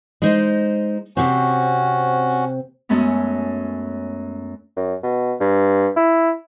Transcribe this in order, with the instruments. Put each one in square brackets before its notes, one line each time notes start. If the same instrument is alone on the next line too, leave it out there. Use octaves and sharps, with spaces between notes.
[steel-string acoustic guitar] G#3 D#4 C5
[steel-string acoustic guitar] C3 C4 [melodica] C#4 F#4
[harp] F#2 G#3 A3 B3 C#4
[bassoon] F#2
B2
G2
E4